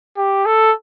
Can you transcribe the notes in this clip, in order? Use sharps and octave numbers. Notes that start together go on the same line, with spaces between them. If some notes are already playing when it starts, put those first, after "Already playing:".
G4
A4